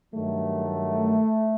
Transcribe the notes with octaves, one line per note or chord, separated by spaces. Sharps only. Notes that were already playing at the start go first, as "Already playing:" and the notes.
G2 D#3 F#3 A3